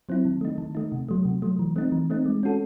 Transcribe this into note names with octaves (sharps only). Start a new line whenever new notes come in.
F#3 C4 E4
D#3
A3 D#4
D#3
A3 D#4
C3
F#3 A3
C3
F#3 A3
E3
A3 C4 D#4
E3
A3 C4 D#4
G#3
C#4 F#4 A4